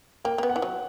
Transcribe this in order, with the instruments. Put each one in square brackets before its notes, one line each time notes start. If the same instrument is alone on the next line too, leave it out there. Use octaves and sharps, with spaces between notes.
[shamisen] A#3 [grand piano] G5
[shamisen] A#3
B3
[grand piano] F#5
[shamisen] E3
F#3